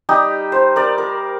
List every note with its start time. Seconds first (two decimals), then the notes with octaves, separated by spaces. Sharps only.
0.09 G3 D#4 G4
0.52 C5
0.76 A#4 D5
0.98 A#4